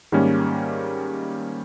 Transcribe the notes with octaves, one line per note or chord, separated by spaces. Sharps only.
G#2 D#3 G3 A#3 C#4